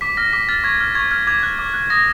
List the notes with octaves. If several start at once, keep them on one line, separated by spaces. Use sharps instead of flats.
D6 B6
F6 A#6
D6 B6
F6 A6
C#6 G#6
F6
C#6 G#6
F6 G#6
D6 G#6
F#6
D6
F#6
D#6 A#6